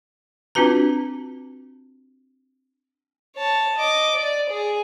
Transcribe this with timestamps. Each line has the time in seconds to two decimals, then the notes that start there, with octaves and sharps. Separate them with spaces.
0.55 C4 D4 F4 F#4 B4 A#5
3.36 C#5 A5
3.77 D#5 D6
4.16 D5
4.50 G#4